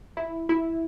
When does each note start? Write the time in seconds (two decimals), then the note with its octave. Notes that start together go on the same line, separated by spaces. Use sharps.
0.17 E4
0.49 E4